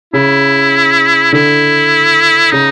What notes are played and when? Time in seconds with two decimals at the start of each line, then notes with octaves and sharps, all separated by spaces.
0.13 C#3 E4
1.32 D3 E4
2.51 C#3 D#4